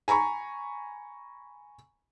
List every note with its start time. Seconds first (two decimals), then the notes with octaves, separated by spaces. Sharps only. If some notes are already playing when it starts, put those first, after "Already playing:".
0.08 G#5 A#5 B5 C#6